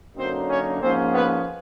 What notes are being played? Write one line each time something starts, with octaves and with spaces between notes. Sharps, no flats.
F#2 D3 F#3 A#3 C4 D#4 C5
C#4 C#5
G#2 F3 A#3 C4 C#4 C5
B3 B4